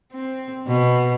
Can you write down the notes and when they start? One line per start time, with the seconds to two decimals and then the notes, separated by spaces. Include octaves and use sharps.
0.13 C4
0.67 B2